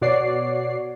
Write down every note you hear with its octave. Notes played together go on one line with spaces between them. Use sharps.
B2 F#4 C#5 D5 C7